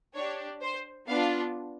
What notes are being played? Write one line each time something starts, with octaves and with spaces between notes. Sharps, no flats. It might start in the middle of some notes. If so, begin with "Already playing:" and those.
D4 G4 C#5
C5
B3 D4 F4 F5